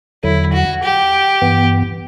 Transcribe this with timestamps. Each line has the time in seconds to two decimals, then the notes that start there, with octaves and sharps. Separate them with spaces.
0.23 E2 D3 F#3 E4
0.53 F#4
0.83 G4
1.42 G2 E3 B3